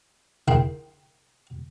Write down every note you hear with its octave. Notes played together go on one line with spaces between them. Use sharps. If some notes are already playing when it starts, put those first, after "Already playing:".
E4 G#4 A#4 G5 A#5 C6